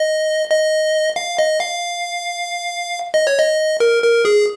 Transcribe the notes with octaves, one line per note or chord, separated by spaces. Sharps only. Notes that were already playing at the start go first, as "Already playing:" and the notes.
Already playing: D#5
D#5
F5
D#5
F5
D#5
C#5
D#5
A#4
A#4
G#4